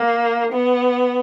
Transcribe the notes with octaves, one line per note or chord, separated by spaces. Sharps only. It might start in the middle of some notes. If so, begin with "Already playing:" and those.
Already playing: A#3
B3